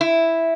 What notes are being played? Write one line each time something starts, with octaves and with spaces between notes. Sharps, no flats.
E4